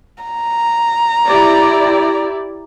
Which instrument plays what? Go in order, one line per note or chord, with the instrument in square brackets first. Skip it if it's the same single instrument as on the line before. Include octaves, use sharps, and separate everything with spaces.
[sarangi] A#5
[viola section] E4 G4 D5